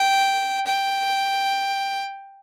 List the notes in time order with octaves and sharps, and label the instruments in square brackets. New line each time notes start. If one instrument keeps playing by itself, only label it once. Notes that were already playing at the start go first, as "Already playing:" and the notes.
Already playing: [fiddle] G5
G5